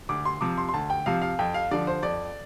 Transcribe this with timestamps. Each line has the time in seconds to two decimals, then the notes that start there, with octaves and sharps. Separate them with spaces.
0.09 D2 D6
0.25 C6
0.41 C3 F3 D6
0.58 C6
0.69 C6
0.74 D2 A5
0.90 G5
1.06 C3 F3 F5
1.22 F5
1.39 F2 G5
1.54 F5
1.71 D3 F3 D5
1.87 C5
2.03 F2 D5